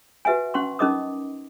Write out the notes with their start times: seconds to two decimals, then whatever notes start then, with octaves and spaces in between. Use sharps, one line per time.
0.25 F#4 B4 E5 F#5 G#5
0.54 C#4 F#5 C6 C#6
0.79 C#4 D#4 A#4 D#5 D6 D#6